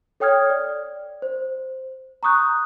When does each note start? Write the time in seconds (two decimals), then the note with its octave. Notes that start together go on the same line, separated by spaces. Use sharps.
0.20 A4 C#5 G5 D#6 F6 G#6
0.50 D5
1.22 C5
2.23 A#5 C#6 D#6 F#6 G6